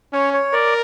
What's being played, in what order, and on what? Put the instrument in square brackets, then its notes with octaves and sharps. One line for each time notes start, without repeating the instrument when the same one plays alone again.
[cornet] C#4 [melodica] C#5
[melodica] C#5
[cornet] A#4 [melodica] D5